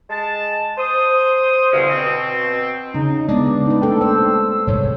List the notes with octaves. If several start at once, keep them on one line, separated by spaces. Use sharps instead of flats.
G#3 A5
C5 D#6
E2 G2 B2 D3 G#3 C#4
B2 C4
C#3 C#4 D#4
G#3 B3 D4 D5
C#4 D#4 B4
A3 A#3 A4 G5
C5 E6
D1 G2 C3 G#3 C#5